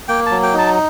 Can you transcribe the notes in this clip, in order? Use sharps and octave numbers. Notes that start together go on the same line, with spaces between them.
A#3 G5
A5
F#3
G5
D#4 A5